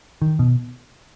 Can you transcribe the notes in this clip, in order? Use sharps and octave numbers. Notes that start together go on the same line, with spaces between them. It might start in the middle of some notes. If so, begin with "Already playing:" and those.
D#3
B2